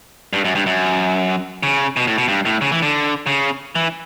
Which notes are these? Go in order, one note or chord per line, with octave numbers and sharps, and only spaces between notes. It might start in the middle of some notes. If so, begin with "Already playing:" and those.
G2
F#2
G2
F#2
C#3
B2
A2
B2
G2
A2
C#3
E3
D3
C#3
E3